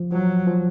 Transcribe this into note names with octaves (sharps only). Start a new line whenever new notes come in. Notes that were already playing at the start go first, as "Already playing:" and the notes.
Already playing: F3
F3 F#3
F3